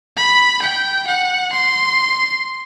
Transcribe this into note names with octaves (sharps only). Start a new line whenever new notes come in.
B5
G5
F#5
C6